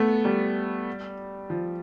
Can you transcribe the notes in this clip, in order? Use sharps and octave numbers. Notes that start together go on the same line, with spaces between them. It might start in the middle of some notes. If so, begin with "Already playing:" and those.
Already playing: A3 B3
G3
F3